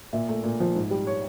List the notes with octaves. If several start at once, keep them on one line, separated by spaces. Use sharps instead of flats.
A#2 E5
A3
A#2
F3
G#2
G3
C#5